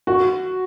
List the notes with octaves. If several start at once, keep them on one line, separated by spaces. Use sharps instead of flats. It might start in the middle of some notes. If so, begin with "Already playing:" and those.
F#4